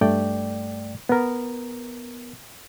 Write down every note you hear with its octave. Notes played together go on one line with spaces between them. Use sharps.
G2 A3 D5 G5
B3 A#4